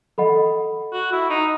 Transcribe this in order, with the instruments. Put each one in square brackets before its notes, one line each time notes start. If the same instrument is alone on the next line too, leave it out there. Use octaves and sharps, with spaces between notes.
[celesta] A4 D#5 F#5 B5
[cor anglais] F#4
E4
D#4